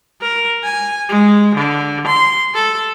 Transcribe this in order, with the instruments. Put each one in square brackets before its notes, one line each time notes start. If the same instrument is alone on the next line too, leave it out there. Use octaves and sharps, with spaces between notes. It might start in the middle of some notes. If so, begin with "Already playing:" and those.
[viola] A#4
G#5
G#3
D3
C6
A4